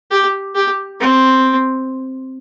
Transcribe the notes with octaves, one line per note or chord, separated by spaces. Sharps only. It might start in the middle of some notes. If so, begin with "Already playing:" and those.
G4
G4
C4